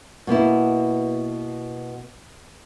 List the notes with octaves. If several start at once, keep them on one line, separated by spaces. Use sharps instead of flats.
B2 A#3 B3 E4